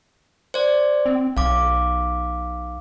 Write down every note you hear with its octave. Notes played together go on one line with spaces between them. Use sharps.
C5 D5
C4
B1 F5 D6